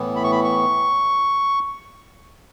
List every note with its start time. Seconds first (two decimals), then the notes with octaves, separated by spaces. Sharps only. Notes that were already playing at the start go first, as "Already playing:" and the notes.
Already playing: A2 E3 B3
0.16 B5
0.24 C#6
0.31 B5
0.44 C#6